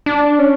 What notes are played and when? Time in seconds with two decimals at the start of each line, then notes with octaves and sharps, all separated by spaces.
0.06 D4
0.39 C#4